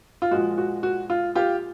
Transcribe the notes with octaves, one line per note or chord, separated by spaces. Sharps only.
F4
A#2 F3 G#3 F#4
F#4
F#4
F4
F4 G4